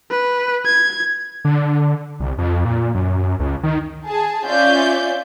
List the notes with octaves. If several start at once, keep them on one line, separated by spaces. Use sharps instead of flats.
B4
G#6
D3
C2
F2
A#2
F#2
C#2
D#3
G#4 A5
C#4 F4 D5 E5 G6